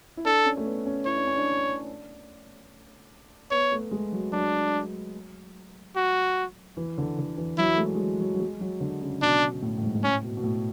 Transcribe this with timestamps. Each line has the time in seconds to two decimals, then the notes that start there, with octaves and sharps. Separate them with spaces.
0.17 E4
0.25 D4 A4
0.46 C#4
0.57 A3
0.66 B3
0.86 C#4
1.06 E4 C#5
1.16 D4
1.27 C#4
1.37 D4
3.51 B3 C#5
3.72 A3
3.91 G#3
4.12 F#3
4.32 F#3 D4
5.96 F#4
6.77 E3
6.98 D3
7.18 D3
7.38 E3
7.58 F#3 E4
7.74 A3
7.78 G#3
7.95 G#3
7.99 F#3
8.20 F#3
8.34 F#3
8.40 G#3
8.60 F#3
8.80 D3
9.01 C#3
9.22 B2 D4
9.62 A2
9.78 A2
9.83 G#2
9.94 G#2
10.02 A2 C#4
10.23 B2
10.37 B2
10.43 A2